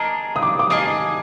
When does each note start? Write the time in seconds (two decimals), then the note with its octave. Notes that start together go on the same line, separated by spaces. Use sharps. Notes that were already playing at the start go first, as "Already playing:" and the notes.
Already playing: A#3 D4 G#4 D#5 A#5
0.36 D#6
0.43 D6
0.59 D6
0.70 A#3 D4 G#4 D#5 D#6